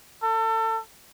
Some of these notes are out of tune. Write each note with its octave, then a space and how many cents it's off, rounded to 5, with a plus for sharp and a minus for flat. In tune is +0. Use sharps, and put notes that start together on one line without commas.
A4 +30